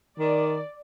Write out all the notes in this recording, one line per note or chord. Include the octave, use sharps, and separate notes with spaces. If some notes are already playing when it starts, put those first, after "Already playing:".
D#3 D5